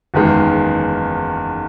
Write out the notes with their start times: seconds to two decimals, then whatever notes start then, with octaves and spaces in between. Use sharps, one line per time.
0.14 F#1 E2 D#3 G#3